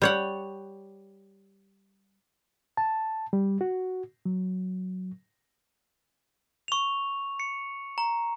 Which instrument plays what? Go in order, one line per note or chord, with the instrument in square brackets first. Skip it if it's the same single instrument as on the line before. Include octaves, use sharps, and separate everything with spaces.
[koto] G3 C#5 F#5
[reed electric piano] A5
G3
F#4
F#3
[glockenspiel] C#6 F7
C#7
A#5